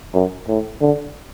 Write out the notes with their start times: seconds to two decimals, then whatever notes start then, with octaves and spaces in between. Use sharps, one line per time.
0.14 F#2
0.48 A2
0.81 D3